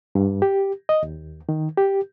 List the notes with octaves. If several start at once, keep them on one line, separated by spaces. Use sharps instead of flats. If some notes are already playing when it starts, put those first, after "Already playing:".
G2
G4
D#5
D#2
D#3
G4